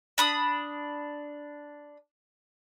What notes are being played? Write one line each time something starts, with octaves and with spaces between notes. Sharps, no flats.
D4 B5 D#6